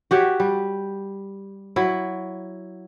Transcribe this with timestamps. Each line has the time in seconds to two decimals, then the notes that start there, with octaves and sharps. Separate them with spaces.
0.11 F#4 G4 C#5 E5
0.40 G3
1.76 F#3 E4